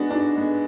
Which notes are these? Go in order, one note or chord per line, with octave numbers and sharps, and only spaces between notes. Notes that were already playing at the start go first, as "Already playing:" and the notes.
Already playing: G#3 B3 D4 F#4
G#2 D4
G#3 B3